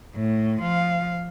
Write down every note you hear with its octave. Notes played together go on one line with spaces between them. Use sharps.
A2
F3 F5